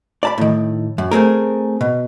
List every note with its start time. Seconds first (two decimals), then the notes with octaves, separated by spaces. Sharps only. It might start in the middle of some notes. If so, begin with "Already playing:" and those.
0.23 D5 A5 B5
0.38 A2 D#3
0.98 F#2
1.11 A3 C4 G#4 A#4
1.81 B2